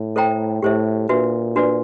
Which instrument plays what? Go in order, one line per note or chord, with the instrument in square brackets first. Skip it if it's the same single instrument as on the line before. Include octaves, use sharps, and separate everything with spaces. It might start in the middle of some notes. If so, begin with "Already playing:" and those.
Already playing: [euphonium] A2
[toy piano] A4 C5 E5 G5 A#5
[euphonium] A2 [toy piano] G4 C5 E5
[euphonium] A#2 [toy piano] D4 F#4 B4 E5
[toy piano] D4 F#4 B4 D5